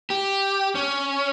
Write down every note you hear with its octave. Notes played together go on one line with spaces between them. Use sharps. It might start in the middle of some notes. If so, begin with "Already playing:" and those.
G4
C#4